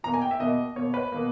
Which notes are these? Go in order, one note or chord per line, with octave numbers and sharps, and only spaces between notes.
B2 A#3 A#5
G#5
G5
E5
B2 A#3 D#5
B2 A#3 C#5
B4
B2 A#3